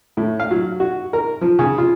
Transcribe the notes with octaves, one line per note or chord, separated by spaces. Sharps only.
A2
F5
F#3
F#4
A#4
F3
C#3
F4